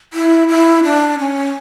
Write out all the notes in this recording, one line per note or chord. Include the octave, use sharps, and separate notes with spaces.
E4
E4
D4
C#4